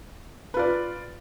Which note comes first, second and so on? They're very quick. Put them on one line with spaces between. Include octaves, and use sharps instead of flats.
B4 F4 D5